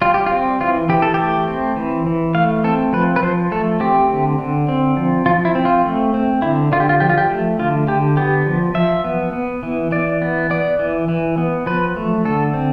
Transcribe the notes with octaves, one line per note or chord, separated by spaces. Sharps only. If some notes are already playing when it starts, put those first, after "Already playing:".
G3 F4
G4
C4 F4
E3 F4
E3 G4
A4
A3 G4
C4
E3
E3
A3 F5
C4 A4
F3 B4
B4
F3 C5
A3 A4
C4 G4
D3
D3
C4
F3
F3 F4
E4
C4
F4
A3
C4
D3 E4
D3 F4
G4
F4
F3 G4
F4
G4
A3
D3 F4
D3 G4
B3 G4
F3
F3 E5
B3
B3
E3
E3 D5
B3
B3 D5
E3
E3
B3
F3 B4
A3
D3 A4
C4